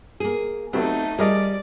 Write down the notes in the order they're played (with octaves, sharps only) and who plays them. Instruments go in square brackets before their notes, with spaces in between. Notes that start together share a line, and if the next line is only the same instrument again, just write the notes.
[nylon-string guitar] A#3 G#4
[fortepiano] F#3 G3 B3 [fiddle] A3 D#4 [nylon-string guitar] C4
[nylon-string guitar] G3 [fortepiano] G#4 A#4 D#5 [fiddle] D5